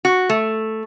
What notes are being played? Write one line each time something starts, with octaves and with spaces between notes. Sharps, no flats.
F#4
A3